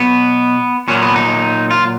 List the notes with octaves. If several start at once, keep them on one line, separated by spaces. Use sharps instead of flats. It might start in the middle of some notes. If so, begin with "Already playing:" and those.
Already playing: B2 F#3 B3
A#2 F#3 C#4
B3
D#4
F4